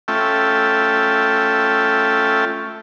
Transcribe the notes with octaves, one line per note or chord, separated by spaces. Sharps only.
A3 C#4 F4 A4 E5 G5